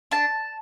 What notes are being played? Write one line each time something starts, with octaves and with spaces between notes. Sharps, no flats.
D4 A5